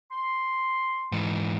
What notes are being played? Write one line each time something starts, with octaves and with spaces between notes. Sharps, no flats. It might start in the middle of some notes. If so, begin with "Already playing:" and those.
C6
G#2 E3